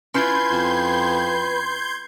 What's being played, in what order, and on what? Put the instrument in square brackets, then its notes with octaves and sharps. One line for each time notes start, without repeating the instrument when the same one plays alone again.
[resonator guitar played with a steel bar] C#4 E4 F4 [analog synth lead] B4 [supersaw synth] C6 G6 G#6
[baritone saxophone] F2